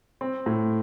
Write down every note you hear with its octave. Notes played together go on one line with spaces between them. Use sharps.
C4
A2